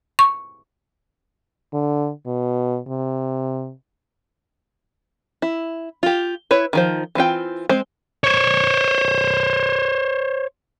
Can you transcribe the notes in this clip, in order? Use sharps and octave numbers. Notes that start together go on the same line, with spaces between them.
C#6
D3
B2
C3
E4
F4 G4
E4 B4 C#5
D#3 F3 C5
E3 C4 F4 G5
G#3 C4 C5
C5 C#5